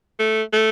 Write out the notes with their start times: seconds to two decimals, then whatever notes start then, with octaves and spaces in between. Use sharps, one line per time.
0.19 A3
0.53 A3